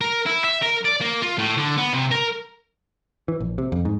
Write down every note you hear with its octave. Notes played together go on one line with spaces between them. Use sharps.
A#4
E4
E5
A#4
D5
A#3
F4
A2
D3
B3
C3
A#4
E3
A#1
C3
F2
G#2